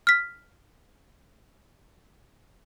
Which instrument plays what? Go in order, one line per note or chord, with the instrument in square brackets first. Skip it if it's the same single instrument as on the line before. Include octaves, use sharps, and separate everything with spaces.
[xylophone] F6 B6